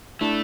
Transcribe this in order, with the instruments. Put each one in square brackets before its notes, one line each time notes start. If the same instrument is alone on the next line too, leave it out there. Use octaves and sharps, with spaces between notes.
[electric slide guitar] A3 [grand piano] D4 E4